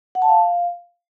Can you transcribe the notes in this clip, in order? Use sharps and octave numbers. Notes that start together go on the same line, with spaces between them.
F#5
A5
F5